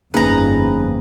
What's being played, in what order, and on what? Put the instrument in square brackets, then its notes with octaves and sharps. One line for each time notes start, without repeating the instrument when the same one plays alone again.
[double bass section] G1 F2 [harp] A#3 [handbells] C#4 D#4 G#4 [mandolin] B4 A#5